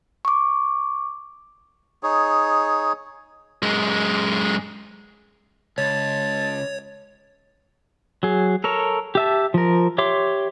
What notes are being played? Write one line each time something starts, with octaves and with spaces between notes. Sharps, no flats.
C#6 D6
D#4 G#4 C#5
F#2 G#3
C#2 C#5 A5
F#3 G#4
A4 A#4 C#5
G4 E5 A5
F3 A#4
G4 C#5 E5 C6 D6